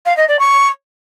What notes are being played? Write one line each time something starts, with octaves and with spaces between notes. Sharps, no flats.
F5
D#5
D5
C#6